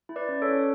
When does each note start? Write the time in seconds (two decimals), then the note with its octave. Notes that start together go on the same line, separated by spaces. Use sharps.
0.09 E4
0.16 B4 D5
0.29 C#4
0.42 A4 C#5
0.48 C#4